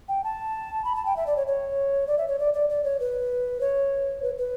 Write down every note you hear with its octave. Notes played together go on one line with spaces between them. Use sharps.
G5
A5
B5
A5
G5
E5
D5
C#5
C#5
D5
E5
C#5
D5
D5
D5
C#5
B4
C#5
B4
B4